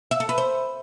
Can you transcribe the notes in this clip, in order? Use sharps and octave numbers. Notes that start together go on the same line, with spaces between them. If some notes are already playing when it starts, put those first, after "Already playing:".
E5
A4
B4
C5